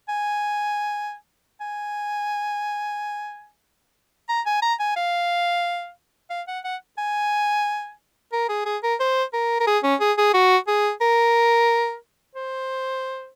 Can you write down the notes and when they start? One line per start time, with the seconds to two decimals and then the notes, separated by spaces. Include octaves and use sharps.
0.09 G#5
1.61 G#5
4.29 A#5
4.46 G#5
4.62 A#5
4.80 G#5
4.96 F5
6.30 F5
6.48 F#5
6.64 F#5
6.98 G#5
8.33 A#4
8.49 G#4
8.66 G#4
8.83 A#4
9.00 C5
9.33 A#4
9.60 A#4
9.67 G#4
9.83 C#4
10.01 G#4
10.18 G#4
10.34 F#4
10.68 G#4
11.01 A#4
12.35 C5